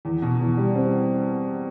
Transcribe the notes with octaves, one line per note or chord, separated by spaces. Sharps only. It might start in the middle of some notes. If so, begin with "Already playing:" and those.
E2
B2
E2
G3
C4